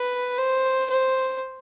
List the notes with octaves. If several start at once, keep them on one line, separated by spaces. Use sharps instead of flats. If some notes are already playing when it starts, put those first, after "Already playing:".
Already playing: B4
C5
C5